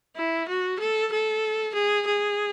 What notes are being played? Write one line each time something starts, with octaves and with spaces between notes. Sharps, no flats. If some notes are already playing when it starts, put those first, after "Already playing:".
E4
F#4
A4
A4
G#4
G#4